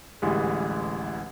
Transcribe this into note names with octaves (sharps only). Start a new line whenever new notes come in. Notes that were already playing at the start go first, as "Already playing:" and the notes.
A1 D2 E3 G3 G#3